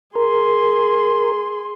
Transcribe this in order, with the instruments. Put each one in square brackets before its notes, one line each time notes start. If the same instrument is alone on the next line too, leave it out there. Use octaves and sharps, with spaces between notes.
[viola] G#4 C6 [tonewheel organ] A#4